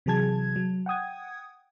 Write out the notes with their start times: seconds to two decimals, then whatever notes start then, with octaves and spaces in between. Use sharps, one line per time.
0.06 C3 E3 F#3 G#4 A5 G#6
0.56 F#3
0.86 F#5 G5 D#6 G#6